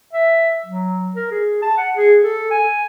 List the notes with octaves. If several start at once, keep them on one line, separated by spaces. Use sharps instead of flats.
E5
F#3
A#4
G#4
A5
F#5
G#4
A4
G#5